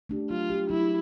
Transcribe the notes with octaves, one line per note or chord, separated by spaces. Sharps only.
A3 D4 G4
F#3 F4
A3 D4 G4
F#3 E4